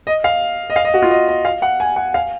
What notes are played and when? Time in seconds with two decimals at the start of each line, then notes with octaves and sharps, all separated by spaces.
0.07 D#5
0.24 F5
0.70 D#5
0.76 F5
0.85 D#5
0.94 F#4
1.02 F4
1.11 D#5
1.28 D#5
1.45 F5
1.62 F#5
1.80 G#5
1.96 F#5
2.14 F5